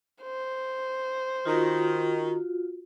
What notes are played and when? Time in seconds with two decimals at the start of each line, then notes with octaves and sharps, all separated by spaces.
0.23 C5
1.45 D#3 F4 F#4